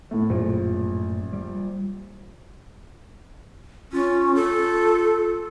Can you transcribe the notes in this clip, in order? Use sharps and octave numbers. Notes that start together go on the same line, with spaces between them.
A2 A3
A#1 F#2 A2
G3
C#4 F4
A4